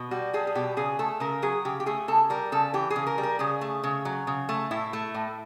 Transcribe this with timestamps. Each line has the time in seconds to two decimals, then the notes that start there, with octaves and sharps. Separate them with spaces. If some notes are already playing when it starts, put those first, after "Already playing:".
Already playing: B2
0.11 G3 F#4
0.33 G3 G#4
0.47 G#4
0.55 B2 G4
0.77 C#3 G#4
0.99 A3 A4
1.20 C#3 A#4
1.42 F#3 G#4
1.65 C#3 G4
1.80 G4
1.86 A3 G#4
2.08 C#3 A4
2.30 G3 A#4
2.52 C#3 A4
2.74 E3 G4
2.90 G#4
2.96 C#3
3.07 A#4
3.18 G3
3.23 A#4
3.39 C#3 G#4
3.61 A3
3.84 C#3
4.05 F#3
4.27 C#3
4.49 A3
4.71 A2 E4
4.93 A3
5.14 A2